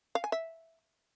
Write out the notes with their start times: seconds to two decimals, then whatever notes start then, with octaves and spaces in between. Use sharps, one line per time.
0.15 F5
0.24 G#5
0.32 E5